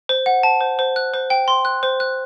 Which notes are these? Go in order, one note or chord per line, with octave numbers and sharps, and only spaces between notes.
C5
F#5
A5
C5
C5
F#6
C5
G5
C6
F#6
C5
F#6